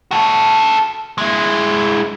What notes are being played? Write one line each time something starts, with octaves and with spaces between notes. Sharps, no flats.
F#4 A4
G#3 E4